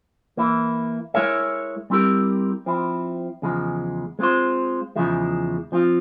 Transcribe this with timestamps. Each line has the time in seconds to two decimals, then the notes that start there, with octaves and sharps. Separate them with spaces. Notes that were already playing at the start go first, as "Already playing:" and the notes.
0.37 E3 A#3 E4
1.14 G#3 E4 A#4 C#5 E5
1.90 G3 C4 E4 G4 A#4
2.66 F3 C4 E4
3.42 E2 C#3 F3 G#3
4.19 G#3 C4 F4 C5
4.96 E2 C#3 F3 G#3 E4
5.72 F3 C4 F4